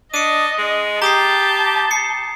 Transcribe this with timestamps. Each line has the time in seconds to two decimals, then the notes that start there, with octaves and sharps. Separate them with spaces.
0.14 D4 D#5 C#7 D#7
0.58 G#3
1.02 G4 A5 A#5 D#6 C7
1.91 C7 C#7